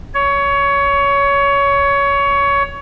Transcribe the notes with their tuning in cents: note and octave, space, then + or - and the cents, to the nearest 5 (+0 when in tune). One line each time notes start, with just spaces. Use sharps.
C#5 +20